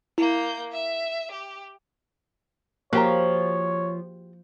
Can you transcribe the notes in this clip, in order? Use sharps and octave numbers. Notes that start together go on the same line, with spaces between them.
A#3 E4 G6
E5
G4
F3 A#3 F#4 G4 C#5 A#5